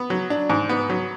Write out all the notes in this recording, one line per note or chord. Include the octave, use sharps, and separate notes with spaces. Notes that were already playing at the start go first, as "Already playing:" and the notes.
Already playing: B3
F#3
D4
G#2
B3
F#3